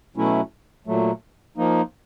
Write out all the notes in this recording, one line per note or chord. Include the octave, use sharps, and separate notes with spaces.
B2 F#3 A3 C#4 E4
A#2 F#3 A3
F3 A#3 D#4